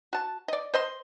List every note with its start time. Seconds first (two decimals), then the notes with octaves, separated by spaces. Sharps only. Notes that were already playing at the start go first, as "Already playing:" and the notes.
0.13 F#4 A5
0.48 D5 D#5
0.74 C5 D#5 C6